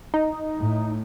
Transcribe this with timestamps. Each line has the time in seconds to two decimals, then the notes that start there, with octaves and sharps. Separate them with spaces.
0.14 D#4
0.58 A2